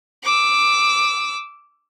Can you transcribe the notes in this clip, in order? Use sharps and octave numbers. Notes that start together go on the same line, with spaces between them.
D6 E6